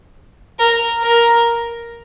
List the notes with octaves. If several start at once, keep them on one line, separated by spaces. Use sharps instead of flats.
A#4
A#4